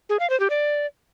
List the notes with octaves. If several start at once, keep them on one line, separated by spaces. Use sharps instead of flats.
G#4
F5
C5
G4
D5